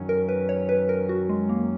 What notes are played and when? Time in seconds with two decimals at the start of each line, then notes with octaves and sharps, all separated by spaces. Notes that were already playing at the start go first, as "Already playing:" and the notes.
Already playing: F#2 D#3 F#3 C#4
0.09 A#4
0.29 B4
0.49 C#5
0.69 B4
0.89 A#4
1.09 F#4
1.29 G#3
1.49 A#3